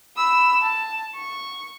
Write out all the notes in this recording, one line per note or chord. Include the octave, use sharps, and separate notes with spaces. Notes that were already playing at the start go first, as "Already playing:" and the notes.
B5 E6
A5
C#6